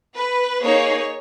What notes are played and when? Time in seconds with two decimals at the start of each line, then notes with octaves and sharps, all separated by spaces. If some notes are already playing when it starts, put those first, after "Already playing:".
0.15 B4
0.62 A#3 D#4 G#4 C#5